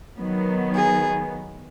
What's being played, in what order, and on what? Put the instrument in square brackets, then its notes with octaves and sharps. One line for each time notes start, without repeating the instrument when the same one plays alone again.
[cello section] D#3 F#3 B3
[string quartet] G#4